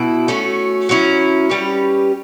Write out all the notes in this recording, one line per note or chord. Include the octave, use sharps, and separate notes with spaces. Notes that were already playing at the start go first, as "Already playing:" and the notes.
Already playing: B2 E4
A3 C#4 F#4
F#3 C#4 E4
G3 C#4 G4 B4